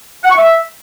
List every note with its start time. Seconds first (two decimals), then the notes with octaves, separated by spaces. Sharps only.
0.24 F#5
0.30 C#6
0.37 E5